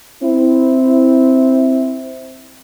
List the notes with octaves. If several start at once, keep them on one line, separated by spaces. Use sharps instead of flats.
C4 E4